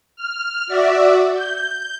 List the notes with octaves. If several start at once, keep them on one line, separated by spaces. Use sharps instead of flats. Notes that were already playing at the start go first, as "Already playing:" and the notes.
F6
F#4 D5 E5
G6